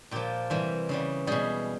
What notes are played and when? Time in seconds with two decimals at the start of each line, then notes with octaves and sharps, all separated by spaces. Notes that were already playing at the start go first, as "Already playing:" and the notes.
0.11 A#2 F3 G4
0.50 C3 E3 G3
0.89 C#3 E3 G3
1.27 B2 G3 G#4